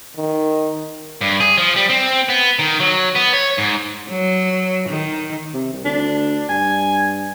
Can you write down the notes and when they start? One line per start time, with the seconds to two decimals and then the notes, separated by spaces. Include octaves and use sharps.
0.17 D#3
1.21 G2
1.40 G#4
1.58 F3
1.76 G3
1.90 C4
2.29 B3
2.59 D#3
2.80 F#3
3.15 B3
3.33 C#5
3.58 G#2
4.09 F#3
4.89 D#3
5.54 C3
5.73 C2
5.85 D2 D4
6.49 G2 G#5